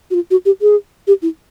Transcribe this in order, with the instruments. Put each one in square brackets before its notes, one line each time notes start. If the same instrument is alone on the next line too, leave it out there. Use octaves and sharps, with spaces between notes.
[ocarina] F#4
F4
F#4
G4
G#4
G4
E4